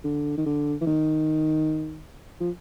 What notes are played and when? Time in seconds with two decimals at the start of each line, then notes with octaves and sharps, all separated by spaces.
0.04 D3
0.38 D#3
0.46 D3
0.81 E3
0.86 D#3
2.41 F3